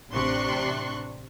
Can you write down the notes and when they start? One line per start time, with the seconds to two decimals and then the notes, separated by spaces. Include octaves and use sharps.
0.12 A1 C3 D4 C6 C#6 F#6